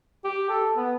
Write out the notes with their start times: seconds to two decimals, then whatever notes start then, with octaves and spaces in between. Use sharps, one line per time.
0.24 G4
0.49 A4
0.77 B3